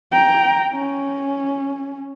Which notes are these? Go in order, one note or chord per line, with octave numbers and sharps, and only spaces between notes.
G5 A#5
C#4